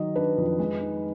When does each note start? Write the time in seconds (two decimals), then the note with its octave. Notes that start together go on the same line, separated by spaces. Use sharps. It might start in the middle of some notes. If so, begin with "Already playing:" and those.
Already playing: D#3 F#3 D#5
0.15 D4 B4
0.38 F2
0.59 G#3
0.81 D#4